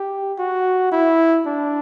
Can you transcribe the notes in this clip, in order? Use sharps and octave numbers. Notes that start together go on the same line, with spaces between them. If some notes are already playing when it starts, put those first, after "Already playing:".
Already playing: G4
F#4
E4
D4